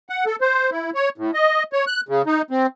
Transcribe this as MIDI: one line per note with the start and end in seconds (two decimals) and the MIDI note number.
0.09 0.25 78
0.26 0.36 69
0.41 0.70 72
0.71 0.90 64
0.95 1.09 73
1.18 1.31 45
1.34 1.63 75
1.73 1.85 73
1.87 2.01 90
2.09 2.22 49
2.26 2.42 63
2.51 2.67 60